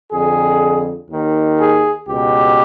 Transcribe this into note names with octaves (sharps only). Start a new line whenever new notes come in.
F2 D3 G#4
D#2 D#3
G#4
C#2 B2 G4